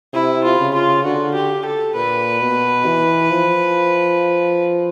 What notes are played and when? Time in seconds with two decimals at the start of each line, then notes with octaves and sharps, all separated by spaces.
0.14 C3 E4
0.44 F4
0.59 C#3
0.75 F4
1.04 D3 F#4
1.34 G4
1.65 A4
1.95 A#2 B4
2.41 B2
2.86 E3
3.31 F3